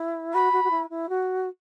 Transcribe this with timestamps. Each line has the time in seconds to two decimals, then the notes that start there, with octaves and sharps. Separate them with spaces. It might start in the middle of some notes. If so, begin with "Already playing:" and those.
Already playing: E4
0.34 F#4 B5
0.53 F#4
0.64 F#4
0.71 E4
0.90 E4
1.09 F#4